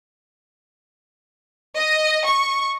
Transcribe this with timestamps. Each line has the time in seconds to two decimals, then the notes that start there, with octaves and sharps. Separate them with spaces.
1.76 D#5
2.25 C#6